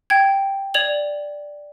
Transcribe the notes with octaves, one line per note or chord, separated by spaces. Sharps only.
G5 G#6
D5 G#6 F7 F#7